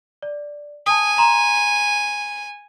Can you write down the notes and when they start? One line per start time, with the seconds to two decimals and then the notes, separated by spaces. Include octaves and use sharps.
0.22 D5
0.86 G#5 A5 D#6
1.18 A#5 C6 E7